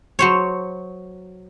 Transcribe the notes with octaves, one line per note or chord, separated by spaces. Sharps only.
F#3 C5 C#5